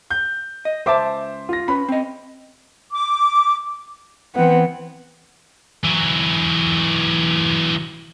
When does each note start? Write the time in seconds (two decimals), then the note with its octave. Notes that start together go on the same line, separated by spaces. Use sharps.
0.10 G6
0.65 D#5
0.86 C#2 C5 E5 A5 D6
1.49 F4 A#6
1.68 C#4 B4 B5
1.88 C4 D#5
2.93 D6
4.35 E3 B3 C4 F#5
5.85 E3 F#3